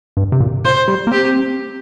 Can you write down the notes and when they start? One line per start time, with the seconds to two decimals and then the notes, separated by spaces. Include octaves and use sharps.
0.17 G2
0.32 C3
0.40 A#2
0.65 A#2 C5
0.88 G3
1.07 A#3
1.12 C4 G4